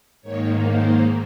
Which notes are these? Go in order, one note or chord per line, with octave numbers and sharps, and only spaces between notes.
G#2 D#3 A#3 C#5
C5